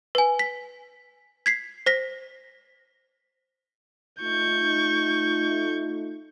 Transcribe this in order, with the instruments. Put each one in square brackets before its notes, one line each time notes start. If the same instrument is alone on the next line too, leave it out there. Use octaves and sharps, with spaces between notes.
[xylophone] B4 G#5
B6
G#6 B6 C7
C5 A#6 B6
[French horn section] A3 D#4 F4 [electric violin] C#6 G6